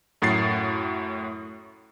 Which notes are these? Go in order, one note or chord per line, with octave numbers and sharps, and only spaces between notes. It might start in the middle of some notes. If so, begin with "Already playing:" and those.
F#2 A2 F#4 A6 C7